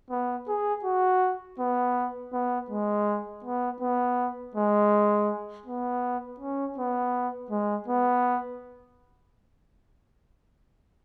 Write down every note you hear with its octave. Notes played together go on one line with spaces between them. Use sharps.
B3
G#4
F#4
B3
B3
G#3
B3
B3
G#3
B3
C#4
B3
G#3
B3